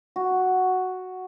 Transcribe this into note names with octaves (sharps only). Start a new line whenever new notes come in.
F#4